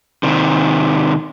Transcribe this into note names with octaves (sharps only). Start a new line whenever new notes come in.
C3 D#3